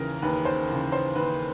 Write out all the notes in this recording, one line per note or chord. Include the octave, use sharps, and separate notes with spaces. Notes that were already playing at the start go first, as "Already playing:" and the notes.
Already playing: D#2 C#3 E3 A#4
D#2 B4
C5
C#3 E3
C5
D#2 B4